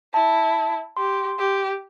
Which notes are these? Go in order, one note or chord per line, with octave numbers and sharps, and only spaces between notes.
E4 A5
G4 C6
G4